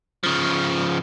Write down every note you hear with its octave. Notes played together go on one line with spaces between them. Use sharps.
C#3 F3